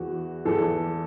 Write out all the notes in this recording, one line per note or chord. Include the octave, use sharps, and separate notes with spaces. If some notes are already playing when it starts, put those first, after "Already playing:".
Already playing: E2 E3 F#4
E2 E3 A4